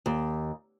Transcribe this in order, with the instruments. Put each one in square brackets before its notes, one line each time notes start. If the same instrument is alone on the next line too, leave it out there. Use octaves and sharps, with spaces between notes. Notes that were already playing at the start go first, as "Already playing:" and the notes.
[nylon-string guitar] D#2